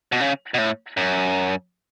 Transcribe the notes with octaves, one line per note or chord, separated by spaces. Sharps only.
B2
C#3
B2
A2
F#2